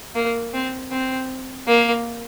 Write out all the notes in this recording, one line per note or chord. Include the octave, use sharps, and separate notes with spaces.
A#3
C4
C4
A#3